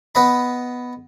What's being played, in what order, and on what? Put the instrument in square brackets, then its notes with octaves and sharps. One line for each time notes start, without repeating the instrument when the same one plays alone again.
[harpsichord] B3 B4 D#5 B5